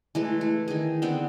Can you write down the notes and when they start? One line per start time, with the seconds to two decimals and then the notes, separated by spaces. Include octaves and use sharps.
0.15 E3 G#3 A3
0.41 A3
0.68 D#3 G#4
1.02 D3 B3 C4 G5